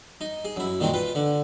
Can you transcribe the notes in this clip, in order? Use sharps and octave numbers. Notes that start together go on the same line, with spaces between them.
D#4
G#4
F#2 E4
A#2 D#3 G#3 C4
F4 B4
D3